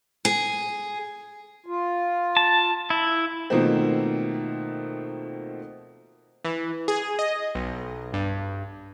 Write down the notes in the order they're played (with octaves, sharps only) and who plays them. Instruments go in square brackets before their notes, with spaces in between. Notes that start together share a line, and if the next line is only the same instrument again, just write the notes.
[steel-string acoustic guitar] G#4
[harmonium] F4
[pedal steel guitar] A5
E4
[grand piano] B2 D#3 F3 A3 A#3 C4
[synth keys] E3
G#4
D#5
B1
G2